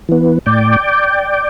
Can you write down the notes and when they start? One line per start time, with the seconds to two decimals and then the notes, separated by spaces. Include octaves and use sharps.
0.09 E3 B3
0.46 A2 D5 G5